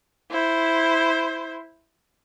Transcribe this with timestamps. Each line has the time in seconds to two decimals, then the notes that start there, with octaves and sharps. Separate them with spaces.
0.31 E4 C5